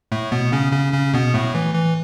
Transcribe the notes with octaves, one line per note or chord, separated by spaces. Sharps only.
A2 A3
B2 B3
C#3 C#4
C#3 C#4
C#3 C#4
B2 B3
A2 A3
E3
E3